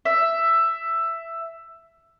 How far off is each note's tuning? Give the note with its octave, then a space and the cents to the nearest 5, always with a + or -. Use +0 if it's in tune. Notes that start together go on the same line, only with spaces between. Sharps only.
E5 +10